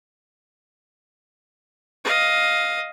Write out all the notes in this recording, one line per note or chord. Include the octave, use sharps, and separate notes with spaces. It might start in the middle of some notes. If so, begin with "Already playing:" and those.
D#5 F5